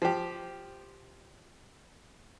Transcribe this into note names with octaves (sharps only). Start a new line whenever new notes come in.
F3 G4